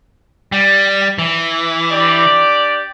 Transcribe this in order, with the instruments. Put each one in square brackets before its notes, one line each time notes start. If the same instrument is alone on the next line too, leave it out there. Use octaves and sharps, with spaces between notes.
[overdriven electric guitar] G3
E3
[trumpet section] D4 G4 D5